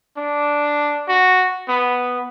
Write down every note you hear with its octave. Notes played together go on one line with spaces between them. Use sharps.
D4
F#4
B3